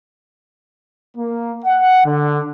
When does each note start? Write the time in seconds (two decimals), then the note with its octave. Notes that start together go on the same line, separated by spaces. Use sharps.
1.18 A#3
1.65 F#5
2.06 D3